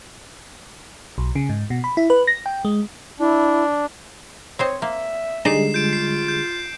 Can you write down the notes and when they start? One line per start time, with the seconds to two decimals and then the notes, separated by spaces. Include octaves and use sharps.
1.18 B1
1.35 C#3
1.49 G#2
1.70 B2
1.84 B5
1.97 E4
2.10 B4
2.27 A#6
2.46 G5
2.65 G#3
3.19 D4 E4
4.59 C4 C5 C#5 D#5
4.82 A#3 E5
5.45 D3 G3 G#3 D#4 D5 D#5 C7 E7
5.74 F4 G6 D7
5.93 C7
6.28 G6